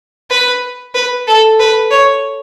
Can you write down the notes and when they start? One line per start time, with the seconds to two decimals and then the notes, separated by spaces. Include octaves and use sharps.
0.30 B4
0.95 B4
1.27 A4
1.59 B4
1.91 C#5